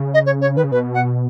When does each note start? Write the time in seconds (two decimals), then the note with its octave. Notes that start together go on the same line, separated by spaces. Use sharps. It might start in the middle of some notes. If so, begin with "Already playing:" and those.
Already playing: C#3
0.14 D#5
0.26 C#5
0.41 C#5
0.56 D#3 B4
0.64 C#3
0.71 B2 B4
0.94 F#5